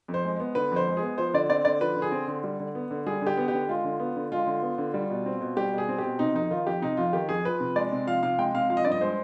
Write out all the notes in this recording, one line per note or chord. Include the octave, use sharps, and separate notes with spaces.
F2
C5
G#3
B3
D3 B4
F2 C5
G#3
G#4
B3
F3 C5
D3 D5
C4 D5
D3 D5
F3 B4
D3
G#4
C4
D3
G3
D3
B3
D3
G3 G#4
D3
G4
B3
G4
D3
G#3 F4
D3
B3
D3
G#3 F4
D3
B3
D3
G3
B2
C4
B2
G3 G4
B2
G#4
C4
G4
B2
C3 D#4
F2 D#4
D#3 F4
F2 G4
C3 D#4
F2 F4
D#3 G4
F2 G#4
F3 B4
C3
G#3 D5
C3
F3 F5
C3 F5
G#3 G5
C3 F5
F3 F5
D#5
G2 D5
D#5
G#3 C5